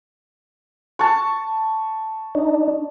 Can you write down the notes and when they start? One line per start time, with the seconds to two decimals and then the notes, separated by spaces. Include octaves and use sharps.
0.99 A5 C#6
2.35 D4 D#4